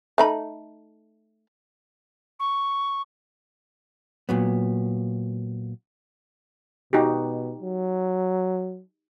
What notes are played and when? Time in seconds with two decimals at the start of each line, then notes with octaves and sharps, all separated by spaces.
0.18 A3 D#4 B5
2.39 C#6
4.29 A#2 F#3 B3
6.93 B2 D#4 F#4 G4
7.62 F#3